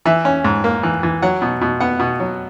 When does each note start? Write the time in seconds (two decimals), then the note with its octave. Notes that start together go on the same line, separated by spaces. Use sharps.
0.05 E3 E5
0.25 C#4
0.44 G#2
0.64 A#3
0.83 E3
1.03 E3
1.22 F#3 F#5
1.42 B2
1.61 B2
1.80 B3 F#5
2.00 B2
2.20 F#3